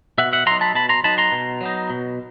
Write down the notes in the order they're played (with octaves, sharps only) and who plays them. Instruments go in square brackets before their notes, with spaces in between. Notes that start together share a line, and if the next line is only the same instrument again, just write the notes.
[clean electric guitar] B2 E5 F#5
E5 F#5
F#3 B3 D#4 A#5 C6
A5 B5
B2 A5 B5
A#5 C6
F#3 B3 D#4 A5 B5
A#5 C6
B2
F#3 B3 D#4
B2